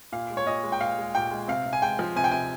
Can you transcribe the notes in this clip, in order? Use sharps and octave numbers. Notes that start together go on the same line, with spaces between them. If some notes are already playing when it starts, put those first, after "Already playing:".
A#2 F5
G#3
C#5
A#2 D#5
G#3
G5
A#2 F5
G#3
A#2 G5
G#3
C3 F5
C3
G#5
G#3 G5
F3
C3 G#5
G5
C3 G#5